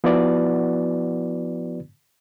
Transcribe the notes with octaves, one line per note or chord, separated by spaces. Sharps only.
F3 B3 E4 F#4 B4 D5